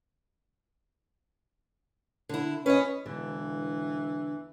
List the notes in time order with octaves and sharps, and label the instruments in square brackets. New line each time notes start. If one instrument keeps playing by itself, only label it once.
[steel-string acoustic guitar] D3 E4
[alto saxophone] C#4 [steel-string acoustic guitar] B4 D#5
[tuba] E1 [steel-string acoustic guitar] D3 [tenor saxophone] E3